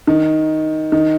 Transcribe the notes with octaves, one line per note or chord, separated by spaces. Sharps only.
D#3
D#3